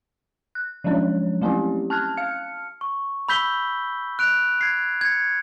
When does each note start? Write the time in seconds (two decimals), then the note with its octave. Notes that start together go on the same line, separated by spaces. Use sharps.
0.55 F#6
0.84 F3 F#3 G#3 C#4 D4 C#5
1.41 F#3 A3 C4 C#4 E4 G4
1.90 A5 F6 F#6 G#6
2.17 F5 F6 C#7
2.81 C#6
3.29 B5 E6 G6 B6 G7
4.19 F#6 D7 F7
4.61 G#6 C7
5.01 G#6 C#7